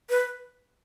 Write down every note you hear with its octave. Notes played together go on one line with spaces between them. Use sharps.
B4